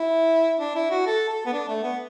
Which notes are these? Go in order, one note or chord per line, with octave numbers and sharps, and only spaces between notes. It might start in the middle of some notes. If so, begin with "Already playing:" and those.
Already playing: E4
D4
E4
F#4
A4
A4
B3
D4
A3
B3